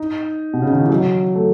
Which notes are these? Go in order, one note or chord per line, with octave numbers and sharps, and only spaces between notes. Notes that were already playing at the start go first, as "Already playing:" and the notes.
Already playing: D#4
B2
C#3
D#3
E3
F#3
A3